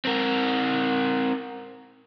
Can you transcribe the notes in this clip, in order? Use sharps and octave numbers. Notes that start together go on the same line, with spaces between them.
C4 A#4